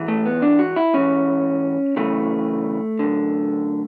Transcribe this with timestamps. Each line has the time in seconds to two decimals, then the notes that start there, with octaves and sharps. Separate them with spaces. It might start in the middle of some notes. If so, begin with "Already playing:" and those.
Already playing: G#2 E3
0.08 A3
0.26 B3
0.42 D4
0.59 F#4
0.76 E4
0.94 G#2 E3 C#4
1.96 F#2 C#3 E3 A3
2.99 F#2 D3